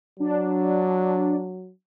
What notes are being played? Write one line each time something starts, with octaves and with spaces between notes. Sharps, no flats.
F#3 D4